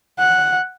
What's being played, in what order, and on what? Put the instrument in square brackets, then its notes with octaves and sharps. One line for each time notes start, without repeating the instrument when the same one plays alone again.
[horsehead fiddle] F#5